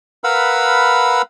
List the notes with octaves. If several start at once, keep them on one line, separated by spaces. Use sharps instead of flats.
A#4 B4 F5 F#5 B5 E6